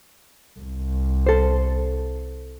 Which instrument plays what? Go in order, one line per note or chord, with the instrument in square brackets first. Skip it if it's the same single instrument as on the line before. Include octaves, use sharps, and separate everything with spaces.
[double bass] C2
[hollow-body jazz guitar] A4 C5